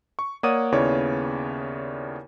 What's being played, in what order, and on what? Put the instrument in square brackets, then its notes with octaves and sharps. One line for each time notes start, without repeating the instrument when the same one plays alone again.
[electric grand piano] C#6
A#3 C#5 D5 F#5 D#6 D#7
D#2 C#3 B3 E4 C#5 D5